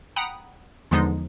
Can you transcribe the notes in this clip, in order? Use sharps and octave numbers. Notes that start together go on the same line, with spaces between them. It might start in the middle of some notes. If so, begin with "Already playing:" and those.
F#5 G5 A#5 B5 D#6 F#6
E2 D3 F3 G#3 B3 D#4